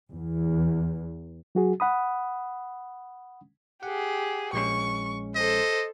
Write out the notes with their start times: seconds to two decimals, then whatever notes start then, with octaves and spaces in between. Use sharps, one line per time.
0.10 E2
1.55 F#3 F#4 G#4
1.80 F#5 B5 D#6
3.83 G4 G#4 F#5
4.53 A#1 G#3 C#4 C#6
5.35 A4 C5 D#5